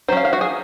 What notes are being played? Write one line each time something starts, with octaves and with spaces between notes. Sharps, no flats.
F#3 C#4 C5 F5
F5
F#4
G#4